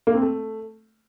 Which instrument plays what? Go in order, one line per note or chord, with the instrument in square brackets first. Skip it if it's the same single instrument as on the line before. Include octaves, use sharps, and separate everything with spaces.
[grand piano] A#3
C4
A3